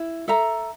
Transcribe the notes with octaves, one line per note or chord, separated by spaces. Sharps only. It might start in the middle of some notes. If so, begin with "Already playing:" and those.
Already playing: E4
A4 E5 A#5